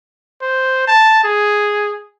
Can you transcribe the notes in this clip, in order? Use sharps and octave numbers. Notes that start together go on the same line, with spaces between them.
C5
A5
G#4